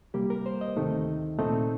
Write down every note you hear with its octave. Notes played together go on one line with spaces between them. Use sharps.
C3 G3 A#3 G4
A#4
C5
D#5
D2 C3 D#3 A3 D#4
A#2 A3 C4 D#4